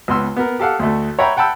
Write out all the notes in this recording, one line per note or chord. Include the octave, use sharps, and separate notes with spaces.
C#2 B3 C6 E6
B3 A#4
G4 A4 F5 F#5
D2 A3
C#5 E5 F#5 G5 A#5 B5
F#5 G5 A5 B5 E6